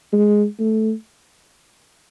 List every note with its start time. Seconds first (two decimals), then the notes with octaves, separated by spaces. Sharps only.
0.12 G#3
0.59 A3